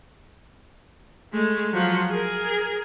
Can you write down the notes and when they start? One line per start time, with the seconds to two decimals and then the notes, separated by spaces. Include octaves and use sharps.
1.33 G#3 A3
1.73 F3 F#3
2.10 G#4 A#4